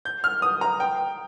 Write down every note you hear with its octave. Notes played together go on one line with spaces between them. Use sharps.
G6
F6
D#6
A#5
G5